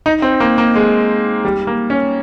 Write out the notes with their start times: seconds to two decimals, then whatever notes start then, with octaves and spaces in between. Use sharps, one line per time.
0.06 D#4
0.22 C4
0.40 A#3
0.58 A#3
0.75 G#3
1.45 G3
1.67 A#3
1.90 C#4